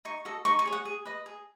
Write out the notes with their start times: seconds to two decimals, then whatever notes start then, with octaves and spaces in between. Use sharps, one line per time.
0.05 D#4 C#6
0.25 F#4 A4 D#5
0.45 D#4 C#6
0.59 C#6
0.66 G#4 C#5
0.72 F#5
0.85 G#4
1.05 B4 D#5
1.26 G#4